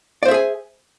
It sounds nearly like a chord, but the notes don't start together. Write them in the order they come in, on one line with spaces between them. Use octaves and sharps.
D5 C5 E5 G#4 G#5